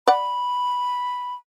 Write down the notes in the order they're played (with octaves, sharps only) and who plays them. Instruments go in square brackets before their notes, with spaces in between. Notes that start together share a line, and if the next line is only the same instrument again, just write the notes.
[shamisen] D5 F#5 [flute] B5